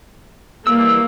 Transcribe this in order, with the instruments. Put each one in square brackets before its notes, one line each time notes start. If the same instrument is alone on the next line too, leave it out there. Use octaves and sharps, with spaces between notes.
[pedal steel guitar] E3 G3 E6 [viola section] A#3